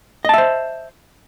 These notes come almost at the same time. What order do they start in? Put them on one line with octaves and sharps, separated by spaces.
D#5 A5 E5 C5